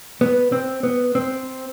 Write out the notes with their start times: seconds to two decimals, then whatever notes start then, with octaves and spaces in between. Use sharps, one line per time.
0.21 B3
0.52 C4
0.83 B3
1.15 C4